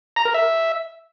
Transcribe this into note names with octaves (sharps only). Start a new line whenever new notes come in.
A#5
A#4
E5